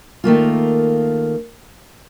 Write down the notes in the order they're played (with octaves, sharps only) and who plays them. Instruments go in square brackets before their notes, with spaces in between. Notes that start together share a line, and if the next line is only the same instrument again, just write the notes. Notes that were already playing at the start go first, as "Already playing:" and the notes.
[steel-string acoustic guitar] D#3 A3 A#3 F4